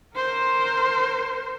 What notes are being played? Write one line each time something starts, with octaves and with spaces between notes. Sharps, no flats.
A#4 C5